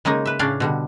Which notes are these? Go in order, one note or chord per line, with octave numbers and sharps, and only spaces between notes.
C#3 G#3 A#3 D#4
B4 E5
A2 C#3 C#4 D4 D5 F5
B2 D3 G3